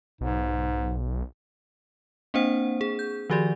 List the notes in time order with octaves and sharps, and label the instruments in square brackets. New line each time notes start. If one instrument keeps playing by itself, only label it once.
[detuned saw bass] B1 [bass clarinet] G#2
[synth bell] A#3 C4 D4 C5 F#5
G#4
G6
D#3 F3 F#4 G4 D5